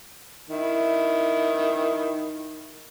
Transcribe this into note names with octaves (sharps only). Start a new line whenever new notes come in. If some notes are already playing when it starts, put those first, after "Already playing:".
D#3 E4